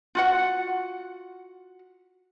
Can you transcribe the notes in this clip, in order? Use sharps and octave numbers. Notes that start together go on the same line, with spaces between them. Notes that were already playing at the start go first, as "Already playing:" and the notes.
F4 F#4 F#5